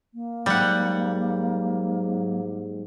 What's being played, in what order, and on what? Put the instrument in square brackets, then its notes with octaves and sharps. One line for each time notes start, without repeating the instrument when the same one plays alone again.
[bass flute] A#3
[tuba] G#2 [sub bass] F#3 [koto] G3 F#5